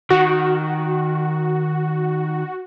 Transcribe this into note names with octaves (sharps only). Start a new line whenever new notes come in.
D#3 F#4